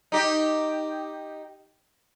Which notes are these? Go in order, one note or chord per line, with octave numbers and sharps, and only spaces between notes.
D#4 G4